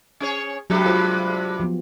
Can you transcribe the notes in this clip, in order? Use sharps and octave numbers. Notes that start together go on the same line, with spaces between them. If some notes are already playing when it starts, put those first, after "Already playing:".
C#4 G#4 C#5
G2 C3 F#3 G#3 G4
F4 C5 F5
F3 B3